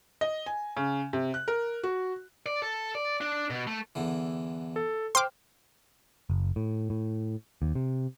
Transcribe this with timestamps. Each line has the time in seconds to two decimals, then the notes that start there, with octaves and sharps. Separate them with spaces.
0.21 D#5
0.46 G#5
0.77 C#3
1.13 C3
1.34 F#6
1.48 A#4
1.83 F#4
2.46 D5
2.62 A4
2.95 D5
3.21 D4
3.50 B2
3.67 A3
3.95 E2 D3 E3
4.76 A4
5.15 C5 G5 C6 D6 F6
6.30 F#1
6.56 A2
6.90 A2
7.62 D#2
7.75 C3